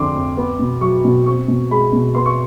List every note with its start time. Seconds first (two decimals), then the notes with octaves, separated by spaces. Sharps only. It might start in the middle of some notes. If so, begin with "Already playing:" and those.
Already playing: F2 D3 C6 D6
0.15 F2
0.37 B3
0.59 B2
0.81 F#3 C#6
1.05 B2
1.26 C4 C#6
1.48 B2
1.71 G#3 B5
1.93 B2
2.15 B3 C6
2.26 C#6